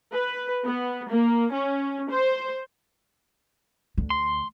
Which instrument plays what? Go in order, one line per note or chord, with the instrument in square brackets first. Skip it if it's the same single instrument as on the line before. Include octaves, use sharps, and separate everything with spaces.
[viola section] B4
B3
A#3
C#4
C5
[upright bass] D2 D3
[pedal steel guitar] C6